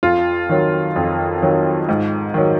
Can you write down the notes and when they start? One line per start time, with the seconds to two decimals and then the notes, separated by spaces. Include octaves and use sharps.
0.03 F2 F4
0.49 D#3 F#3
0.96 F2
1.42 D#3 F#3
1.89 G#2
2.34 D#3 F#3